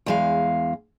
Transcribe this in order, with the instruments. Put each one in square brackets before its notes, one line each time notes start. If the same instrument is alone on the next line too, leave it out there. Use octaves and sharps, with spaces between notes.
[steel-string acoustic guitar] E2 G#3 F5